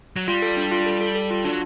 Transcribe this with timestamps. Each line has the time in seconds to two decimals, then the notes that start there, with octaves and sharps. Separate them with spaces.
0.17 F#3
0.27 G3 F4
0.42 A4
0.57 D4
0.72 F4
0.86 A4
1.01 A4
1.15 A4
1.31 F4
1.45 F#3 D4